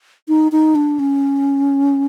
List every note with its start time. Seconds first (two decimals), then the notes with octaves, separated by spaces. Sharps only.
0.28 D#4
0.52 D#4
0.75 D4
0.99 C#4